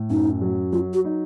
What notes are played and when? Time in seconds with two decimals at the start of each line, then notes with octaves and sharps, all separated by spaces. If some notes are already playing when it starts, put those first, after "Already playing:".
Already playing: A2
0.10 F#2 D#4
0.41 F#3
0.72 F#3 F4
0.94 F#4
1.05 D#4